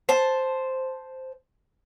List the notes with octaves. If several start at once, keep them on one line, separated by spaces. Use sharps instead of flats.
C5 A5